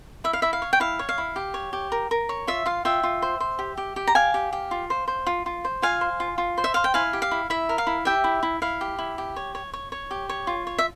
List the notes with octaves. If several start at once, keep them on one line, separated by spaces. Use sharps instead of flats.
E4 E5
F5
E4 E5
F5
C#5
G5
E4 F5
C#5
F5
E4
G4
C#5
G4
A#4
A#4
C#5
F4 E5
F4 F5
F4 E5 G5
F4
C5
C5
G4
G4
G4
A#5
G4 F5 G#5
G4
G4
F4
C5
C5
F4
F4
C5
F4 F5 G#5
C5
F4
F4
C5
E5
C5 F5
G5
E4 F5 G#5
G4
F5
E4
E4 E5
A#4
F5
E4
G4 E5 G5
E4
E4
E4 F5
G4
E4
G4
C#5
C#5
C#5
C#5
G4
C#5
F4
C#5
E5